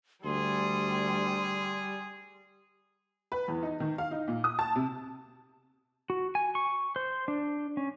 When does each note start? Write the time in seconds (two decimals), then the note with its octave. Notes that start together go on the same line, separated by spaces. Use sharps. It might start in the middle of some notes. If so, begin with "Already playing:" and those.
0.24 D2 G3 G#4 C6
3.32 B4
3.48 E2
3.63 D#4
3.80 D#3
3.98 F5
4.11 D#4
4.28 A#2
4.44 D#6
4.59 A5
4.76 C3
6.10 F#4
6.35 G#5
6.55 C#6
6.96 C5
7.28 D4
7.77 C#4